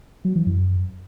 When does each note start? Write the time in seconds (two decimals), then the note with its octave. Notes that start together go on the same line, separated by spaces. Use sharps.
0.25 F#3
0.36 E3
0.47 F#2